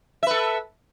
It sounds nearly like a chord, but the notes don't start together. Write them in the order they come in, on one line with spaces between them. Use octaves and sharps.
E5 B4 A4